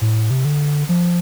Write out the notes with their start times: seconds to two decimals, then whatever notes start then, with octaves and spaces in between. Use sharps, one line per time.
0.01 A2
0.31 C3
0.45 D3
0.89 F3